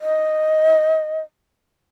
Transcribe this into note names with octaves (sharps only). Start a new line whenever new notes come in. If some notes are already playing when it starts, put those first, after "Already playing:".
D#5